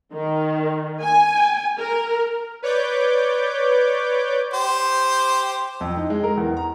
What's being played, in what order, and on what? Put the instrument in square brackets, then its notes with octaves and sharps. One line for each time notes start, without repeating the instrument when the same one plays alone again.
[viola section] D#3
G#5
A#4
[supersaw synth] B4 C#5 D5 D6 G6
[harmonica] G4 C5
[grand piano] F2
D#4
G#3
A#4
E2
A#5